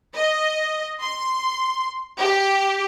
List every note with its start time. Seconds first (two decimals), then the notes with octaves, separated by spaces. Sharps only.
0.15 D#5
1.02 C6
2.19 G4